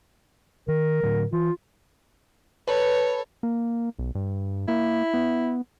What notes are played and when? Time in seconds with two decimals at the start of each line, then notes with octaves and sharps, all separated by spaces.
0.68 D#3 A#4
1.03 A2 D3 F#3
1.32 E3 F4
2.68 A4 B4 C#5
3.43 A#3
3.99 B1
4.15 G2
4.68 A#3 E4
5.14 B3